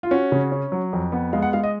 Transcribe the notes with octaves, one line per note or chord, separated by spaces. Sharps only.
F4
C#4 F#4
C#3
C#4
F#3
F2
B3
G#3 F5
F#5
G#3 F5
D#5